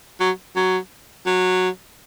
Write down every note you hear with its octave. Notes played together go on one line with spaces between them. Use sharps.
F#3
F#3
F#3